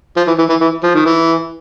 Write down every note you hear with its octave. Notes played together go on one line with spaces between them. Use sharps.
F3
E3
E3
E3
E3
F3
D#3
E3